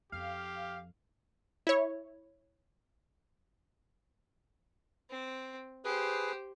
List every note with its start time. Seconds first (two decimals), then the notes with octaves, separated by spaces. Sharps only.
0.12 F2 G4 F5
1.67 E4 C#5
5.10 C4
5.85 G4 G#4 B4 C5